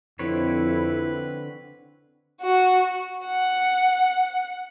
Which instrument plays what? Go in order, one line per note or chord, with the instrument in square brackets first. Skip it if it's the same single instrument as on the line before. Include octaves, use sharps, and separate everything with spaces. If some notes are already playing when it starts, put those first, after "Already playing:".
[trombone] F2 [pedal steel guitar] D3 C4 C#5 [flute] E4 [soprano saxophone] B4
[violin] F#4
F#5